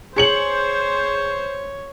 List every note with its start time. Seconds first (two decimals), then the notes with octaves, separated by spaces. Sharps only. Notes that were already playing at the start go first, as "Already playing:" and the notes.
0.16 G#4 C5 C#5 C#7 F#7